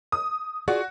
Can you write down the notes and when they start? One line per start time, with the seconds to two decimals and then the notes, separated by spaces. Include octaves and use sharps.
0.12 D#6
0.68 F4 F#4 G#4 D5